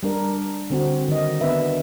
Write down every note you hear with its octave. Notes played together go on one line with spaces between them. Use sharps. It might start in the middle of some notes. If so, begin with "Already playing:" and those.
G3 D4 A#4
D3 C4 F#4
D#3 D#5
B3 D4 B4 E5